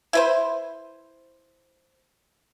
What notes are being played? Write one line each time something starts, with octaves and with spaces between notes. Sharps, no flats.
E4 B4 C5